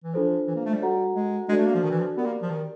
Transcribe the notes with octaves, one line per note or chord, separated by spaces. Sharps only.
E3
F3 D4 F4 A4 C5
E3
A#3
A3
G3
F#4 A4 C#5 F#5 A#5
G#3
G#3 D4 F#4 A4 D5
A3
A#3
F3
D#3
E3
F3
B3 G4 A#4 D5
A#3
F3
D#3